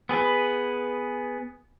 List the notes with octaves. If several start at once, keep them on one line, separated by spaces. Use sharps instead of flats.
B3 G#4 B4